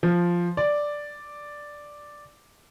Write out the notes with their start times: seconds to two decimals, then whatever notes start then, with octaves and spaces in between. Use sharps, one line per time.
0.03 F3
0.57 D5